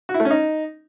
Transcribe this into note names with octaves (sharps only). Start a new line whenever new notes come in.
F#4
E4
A3
C#4
D#4